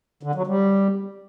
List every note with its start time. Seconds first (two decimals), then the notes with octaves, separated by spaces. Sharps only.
0.23 D3
0.35 F#3
0.47 G3